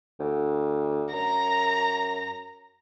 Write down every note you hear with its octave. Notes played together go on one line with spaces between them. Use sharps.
D2
F#2 A#5